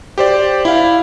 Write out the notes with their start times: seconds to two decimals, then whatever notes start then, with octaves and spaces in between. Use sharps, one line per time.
0.18 G4 C5 D5
0.65 E4 F5